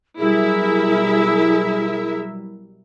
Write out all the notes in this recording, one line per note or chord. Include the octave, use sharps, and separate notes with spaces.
B2 F#3 G3 E4 G#4 A#4 E5